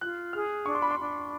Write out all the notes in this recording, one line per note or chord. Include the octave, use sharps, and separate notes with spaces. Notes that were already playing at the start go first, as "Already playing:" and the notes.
F4 F#6
G#4 F6
D4 C#6
C6
B5
C6
D4